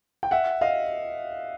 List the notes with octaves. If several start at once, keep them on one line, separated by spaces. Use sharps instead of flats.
G5
E5 F#5
D#5 F5